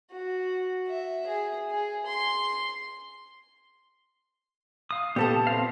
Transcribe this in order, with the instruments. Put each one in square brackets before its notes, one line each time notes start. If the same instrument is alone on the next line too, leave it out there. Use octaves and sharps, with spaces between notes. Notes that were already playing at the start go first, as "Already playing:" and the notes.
[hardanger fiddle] F#4
E5
G#4
G#4
C6
[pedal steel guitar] F5 D#6
[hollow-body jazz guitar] A#2 B3 A4 [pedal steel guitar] G4 A5
[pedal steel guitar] C4 F5